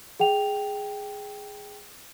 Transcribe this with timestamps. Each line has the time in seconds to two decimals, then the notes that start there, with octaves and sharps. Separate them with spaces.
0.20 G#4 F#5 G5 F7